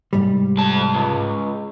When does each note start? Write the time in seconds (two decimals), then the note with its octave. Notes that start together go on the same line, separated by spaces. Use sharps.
0.13 C2 G#2 G3
0.58 F2 A5
0.94 C#2